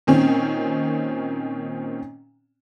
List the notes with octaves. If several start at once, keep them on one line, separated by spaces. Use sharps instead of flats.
A#2 D#3 C4 C#4